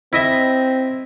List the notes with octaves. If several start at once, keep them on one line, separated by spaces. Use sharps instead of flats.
C4 E4 D#5 E5